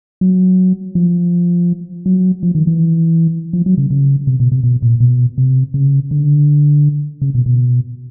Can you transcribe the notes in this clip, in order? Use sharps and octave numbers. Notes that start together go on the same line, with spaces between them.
F#3
F3
F#3
F3
D#3
E3
F3
F#3
C#3
C#3
C3
B2
C3
B2
A#2
B2
C3
C#3
D3
C#3
B2
B2